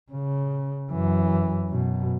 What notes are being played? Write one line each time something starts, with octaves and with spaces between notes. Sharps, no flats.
C#3
F#2 E3
F#2 B2